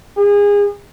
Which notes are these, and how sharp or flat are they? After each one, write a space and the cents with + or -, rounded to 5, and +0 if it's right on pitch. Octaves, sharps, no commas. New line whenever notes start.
G#4 -30